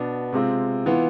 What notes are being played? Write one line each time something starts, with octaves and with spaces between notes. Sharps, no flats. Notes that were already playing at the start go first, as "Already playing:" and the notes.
Already playing: B2 B3 D4
C3 G#3 C4 F4
E3 B3 F4